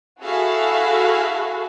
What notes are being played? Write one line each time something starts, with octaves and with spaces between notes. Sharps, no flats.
E4 F#4 G#4 A4 E5 F5